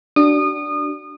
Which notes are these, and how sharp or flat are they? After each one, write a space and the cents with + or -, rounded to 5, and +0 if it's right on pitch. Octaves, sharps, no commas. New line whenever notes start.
D4 +0 F#4 +35 D#6 -30